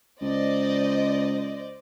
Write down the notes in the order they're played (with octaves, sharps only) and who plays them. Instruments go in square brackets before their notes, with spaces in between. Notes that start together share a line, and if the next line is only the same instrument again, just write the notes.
[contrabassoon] C#2 [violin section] C5 D5 D#5